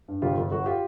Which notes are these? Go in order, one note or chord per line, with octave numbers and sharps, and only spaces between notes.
G2
G1 F4 G4
G1
G1 F#4
F4 G4